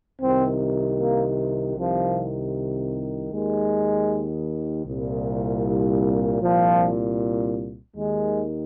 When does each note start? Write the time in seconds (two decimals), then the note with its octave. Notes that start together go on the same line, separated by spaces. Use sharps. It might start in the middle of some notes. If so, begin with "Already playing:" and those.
0.22 C2 C3 D#3 C4
0.99 A#3
1.76 C2 C3 D#3 F3
3.32 D#2 D#3 G#3
4.86 C2 A#2
6.41 C2 A#2 F3
7.96 D#2 D#3 G#3